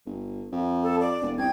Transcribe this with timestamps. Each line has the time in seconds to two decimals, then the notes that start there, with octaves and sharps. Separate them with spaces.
0.06 G1
0.52 F2
0.82 A4
0.99 D5
1.22 E1
1.38 C2 G5 G#6